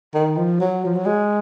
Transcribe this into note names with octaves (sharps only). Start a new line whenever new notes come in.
D#3
F3
F#3
F3
F#3
G#3